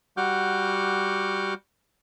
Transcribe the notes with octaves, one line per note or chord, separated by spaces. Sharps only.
G3 F#4 F#5 D6 F6 G6